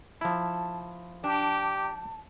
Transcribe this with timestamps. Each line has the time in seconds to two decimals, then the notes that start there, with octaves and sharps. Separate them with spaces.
0.21 F3 E4 A5
1.24 D4 G4 A5